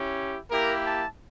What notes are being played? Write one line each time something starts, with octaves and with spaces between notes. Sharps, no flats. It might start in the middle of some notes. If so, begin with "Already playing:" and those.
Already playing: C#4 E4 G4
A#3 E4 G4 A#4
A5